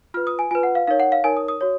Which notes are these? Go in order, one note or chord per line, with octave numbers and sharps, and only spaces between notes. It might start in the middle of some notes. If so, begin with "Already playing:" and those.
F4 B4 F6
D#6
G#5
F4 B4 G#5
F#5
F5
D#4 A#4 C#5 F5
F#5
F5
D#4 A#4 C#5 G#5
D#6
D#6
F#4 C#5